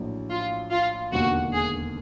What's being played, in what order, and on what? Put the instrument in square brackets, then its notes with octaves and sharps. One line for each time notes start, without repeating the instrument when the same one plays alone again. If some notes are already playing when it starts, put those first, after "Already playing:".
Already playing: [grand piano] A#1 A2 F#3
[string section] F4
F4
[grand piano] E1 D#2 D3 [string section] F#4
[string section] G#4